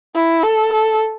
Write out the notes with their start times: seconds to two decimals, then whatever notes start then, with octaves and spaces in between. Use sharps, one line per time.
0.15 E4
0.43 A4
0.72 A4